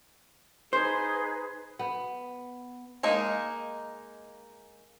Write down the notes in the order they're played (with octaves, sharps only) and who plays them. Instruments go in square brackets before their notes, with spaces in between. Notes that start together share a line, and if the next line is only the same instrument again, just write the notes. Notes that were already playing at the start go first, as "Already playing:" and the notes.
[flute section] D#4 G#4 B4 [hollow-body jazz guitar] C5
[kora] B3
[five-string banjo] G#3 A#3 D#4